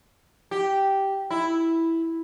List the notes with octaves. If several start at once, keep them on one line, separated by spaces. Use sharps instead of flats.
G4
E4